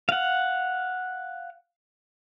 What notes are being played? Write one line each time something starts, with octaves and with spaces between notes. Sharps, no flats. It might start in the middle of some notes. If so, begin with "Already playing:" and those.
F5 F#5